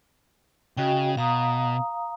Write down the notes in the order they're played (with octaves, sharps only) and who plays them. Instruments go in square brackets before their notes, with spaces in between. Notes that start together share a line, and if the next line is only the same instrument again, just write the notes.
[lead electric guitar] C#3 [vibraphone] F#4 D#5 G5
[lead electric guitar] B2 [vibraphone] F5 A#5 D#6